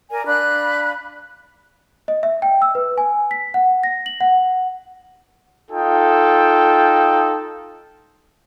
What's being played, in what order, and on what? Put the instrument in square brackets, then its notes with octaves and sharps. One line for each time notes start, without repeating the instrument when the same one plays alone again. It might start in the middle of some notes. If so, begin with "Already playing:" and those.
[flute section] A#4 D5 G#5
D4 F5 B5 F#6
[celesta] D#5
E5
G5
E6
B4
G#5
B6
F#5
A#6
F#7
F#5
[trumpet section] D#4 F4 A4 G5